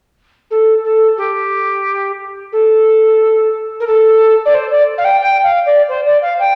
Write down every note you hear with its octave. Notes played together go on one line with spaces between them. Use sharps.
A4
A4
G4
A4
A#4
A4
D5
C5
D5
F5
G5
G5
F5
D5
C5
D5
F5
G5